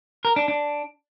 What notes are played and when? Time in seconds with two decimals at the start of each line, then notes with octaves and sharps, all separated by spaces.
0.25 A#4
0.36 D4
0.48 D4